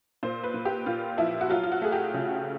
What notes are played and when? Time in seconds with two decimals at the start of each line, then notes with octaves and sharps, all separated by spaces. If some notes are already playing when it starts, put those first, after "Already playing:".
0.23 A#2 C5
0.44 B4
0.54 A#2
0.65 G4
0.86 A#2 F4
1.18 F3 E4
1.41 F#4
1.49 F#3 F4
1.63 F4
1.72 F#4
1.82 A3 G#4
1.92 G4
2.14 C#3